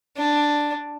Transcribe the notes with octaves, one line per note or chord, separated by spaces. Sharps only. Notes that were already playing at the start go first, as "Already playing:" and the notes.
D4